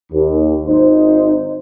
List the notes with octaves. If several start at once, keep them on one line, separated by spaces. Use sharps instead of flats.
D#2
G#1 D#4 C5